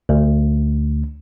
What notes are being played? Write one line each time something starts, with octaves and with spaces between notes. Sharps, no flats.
D2